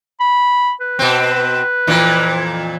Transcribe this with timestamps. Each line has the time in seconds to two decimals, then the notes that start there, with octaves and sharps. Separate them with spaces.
0.20 B5
0.81 B4
0.99 B2 C4
1.87 F2 A#2 E3